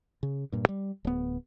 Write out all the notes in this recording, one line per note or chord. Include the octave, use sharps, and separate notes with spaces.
C#3
G2 A#2
G3
D1 B3